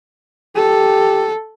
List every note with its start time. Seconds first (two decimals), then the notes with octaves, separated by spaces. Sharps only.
0.56 G4 A4